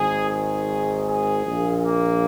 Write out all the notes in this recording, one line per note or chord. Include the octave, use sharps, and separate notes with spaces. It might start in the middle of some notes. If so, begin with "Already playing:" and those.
Already playing: G#1 G#2 D#3 G#4
G#4
G#4
A#1 A#2
A#3